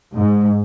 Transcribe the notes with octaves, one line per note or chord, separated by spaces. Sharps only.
G#2